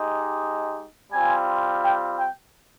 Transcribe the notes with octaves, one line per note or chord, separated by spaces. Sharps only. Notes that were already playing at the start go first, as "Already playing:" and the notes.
Already playing: G#3 D#4 G4
G3 C4 F4 G#5
G5
G5